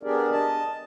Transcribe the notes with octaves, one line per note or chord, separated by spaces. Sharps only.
B3 D4 G4 G#4 A#4 D5
D#5 A5